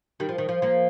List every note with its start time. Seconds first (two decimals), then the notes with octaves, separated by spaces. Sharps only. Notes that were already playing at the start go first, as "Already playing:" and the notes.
0.20 D#3 G3
0.29 F3
0.38 D#3
0.49 F3
0.62 F3 A#3